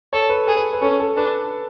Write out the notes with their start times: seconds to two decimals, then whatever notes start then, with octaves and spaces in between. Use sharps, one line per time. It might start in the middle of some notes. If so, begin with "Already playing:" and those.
0.13 A4 C#5
0.30 B4
0.47 G#4 A4
0.57 B4
0.73 B4
0.82 C#4 A4
1.00 A4
1.17 D4 B4